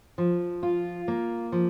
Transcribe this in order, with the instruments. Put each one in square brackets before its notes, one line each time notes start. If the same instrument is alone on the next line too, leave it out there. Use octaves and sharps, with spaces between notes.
[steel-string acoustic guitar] F3
F4
A#3
F3